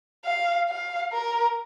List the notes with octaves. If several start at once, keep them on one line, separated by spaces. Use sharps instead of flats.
F5
F5
A#4